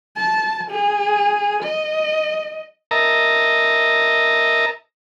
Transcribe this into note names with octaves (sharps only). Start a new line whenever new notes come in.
A5
G#4
D#5
A#4 D#5 E5 A5 A#5